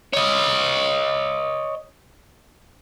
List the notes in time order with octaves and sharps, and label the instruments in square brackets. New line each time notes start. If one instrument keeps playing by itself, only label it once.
[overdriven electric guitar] C#5 D#5